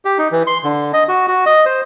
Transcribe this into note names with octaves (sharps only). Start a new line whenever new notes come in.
G4
D#4
E3
C6
D3
D#5
F#4
F#4
D#5
C5